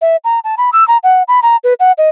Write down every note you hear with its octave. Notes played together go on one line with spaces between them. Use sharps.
E5
A#5
A5
B5
E6
A#5
F#5
B5
A#5
B4
F#5
D#5